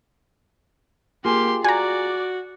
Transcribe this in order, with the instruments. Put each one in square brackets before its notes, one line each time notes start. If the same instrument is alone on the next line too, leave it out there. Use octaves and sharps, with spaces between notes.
[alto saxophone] A#3 [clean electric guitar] F4 G#4 [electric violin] G4 C6
[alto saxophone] F#4 [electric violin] D5 [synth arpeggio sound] G#5 A#5